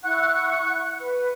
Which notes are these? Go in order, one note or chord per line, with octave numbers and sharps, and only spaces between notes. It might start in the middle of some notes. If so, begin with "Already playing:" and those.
E4 F#5 C#6 F#6
B4